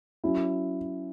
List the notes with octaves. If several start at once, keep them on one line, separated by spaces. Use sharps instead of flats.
F#3 C#4 E4